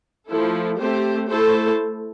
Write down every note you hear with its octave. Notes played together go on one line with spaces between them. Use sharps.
F3 A3 E4 A4
A3 C4 G4 C5
A3 E4 A4 C5